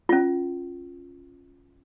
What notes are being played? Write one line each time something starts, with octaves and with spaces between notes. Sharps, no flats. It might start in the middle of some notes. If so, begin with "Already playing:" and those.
C#4 F4